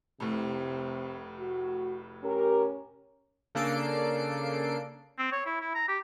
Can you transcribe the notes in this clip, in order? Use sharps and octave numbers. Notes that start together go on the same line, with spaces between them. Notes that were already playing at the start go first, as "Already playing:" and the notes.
F1 A2 C3
F#4
C#4 G4 A#4
C#3 A#3 D4 A4 C7 D7
C4
C#5
E4
E4
A#5
G4